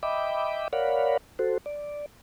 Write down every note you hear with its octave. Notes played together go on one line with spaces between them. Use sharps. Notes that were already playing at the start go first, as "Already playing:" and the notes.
D#5 E5 G5 B5 D6
A#4 C#5 D5 F5 F#5 B5
F#4 A4 C5
D5